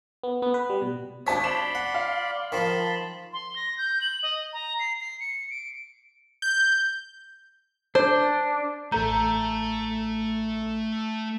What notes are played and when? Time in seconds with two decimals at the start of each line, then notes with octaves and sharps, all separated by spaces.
0.23 B3
0.42 B3
0.54 B4
0.70 G3
0.82 B2
1.27 G#1 D4 C5 C#5 A5 B6
1.44 D5 B5 C6 E7
1.75 F#5
1.94 F5
2.52 D#3 F3 A5 B5 C6
3.33 C6
3.56 A#6
3.78 G6
4.01 F#7
4.23 D#5
4.53 A#5
4.79 C7
5.00 C7
5.20 C#7
5.50 D7
6.42 G6
7.95 D4 C5
8.92 A1 A3 A4 A#5 G6